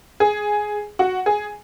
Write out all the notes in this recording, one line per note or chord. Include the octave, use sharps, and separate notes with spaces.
G#4
F#4
G#4